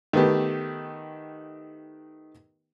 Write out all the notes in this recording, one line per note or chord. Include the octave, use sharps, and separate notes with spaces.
D#3 A3 B3 G4